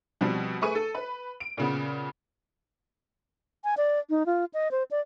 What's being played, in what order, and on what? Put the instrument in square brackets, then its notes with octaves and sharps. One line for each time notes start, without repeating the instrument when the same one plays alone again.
[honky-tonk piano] B2 F3 G3 C4
A3 G#4 B4 C#6 D#7
A4
B4 B5
D7
A#2 C#3 B3
[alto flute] G#5
D5
D#4
F4
D#5
C5
D5